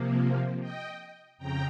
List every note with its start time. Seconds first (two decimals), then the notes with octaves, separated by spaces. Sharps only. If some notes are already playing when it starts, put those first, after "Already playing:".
Already playing: C3 F3 A#3
0.61 D#5 G5
1.38 F2 C#3 G5 A#5